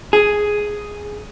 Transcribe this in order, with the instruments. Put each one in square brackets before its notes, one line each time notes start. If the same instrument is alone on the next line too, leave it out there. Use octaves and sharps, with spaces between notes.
[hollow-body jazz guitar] G#4